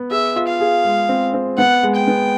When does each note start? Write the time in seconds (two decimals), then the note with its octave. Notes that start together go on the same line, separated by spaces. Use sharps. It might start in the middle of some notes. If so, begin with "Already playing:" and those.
Already playing: B3
0.11 G#4 E5
0.36 F4
0.47 F5
0.60 G#4
0.85 G#3
1.09 C4
1.34 C4
1.58 B3 F#5
1.83 G#3
1.95 G5
2.08 B3